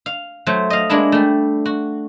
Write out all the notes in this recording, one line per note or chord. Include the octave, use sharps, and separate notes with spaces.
F5
F#3 A3 C5
D#5 F5
G#3 A#3 D4 E4
G3 A3
F#4